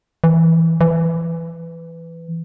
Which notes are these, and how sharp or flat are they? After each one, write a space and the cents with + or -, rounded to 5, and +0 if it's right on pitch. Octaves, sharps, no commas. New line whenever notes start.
E3 -5
E3 +15